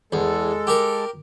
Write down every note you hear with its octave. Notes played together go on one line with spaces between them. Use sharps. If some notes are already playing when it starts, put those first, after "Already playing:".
E2 G#3 A4
G4 A#4